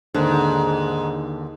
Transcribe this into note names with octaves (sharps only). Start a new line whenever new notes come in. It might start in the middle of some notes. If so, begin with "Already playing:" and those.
D#2 G#2 D3